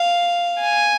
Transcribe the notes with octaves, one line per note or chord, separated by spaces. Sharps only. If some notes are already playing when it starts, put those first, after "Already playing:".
Already playing: F5
G#5